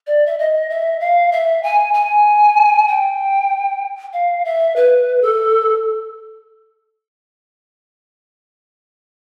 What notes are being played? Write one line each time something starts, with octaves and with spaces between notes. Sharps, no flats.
D5
E5
D#5
E5
F5
E5
G#5
G#5
G5
F5
E5
B4
A4